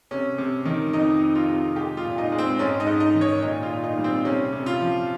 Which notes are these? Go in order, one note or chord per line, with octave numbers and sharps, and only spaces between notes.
C3 C#4
C3
D#3
F2 D#4
F2
F4
C3
G#3 G4
F4
A#2
D#4
G#3
C4
G#2 C#4
D#4
G#2
D#4
D#3
C#5
A#2 D#4
F4
A#2
D#4
G3
C4
C3 C#4
C3
F4
F3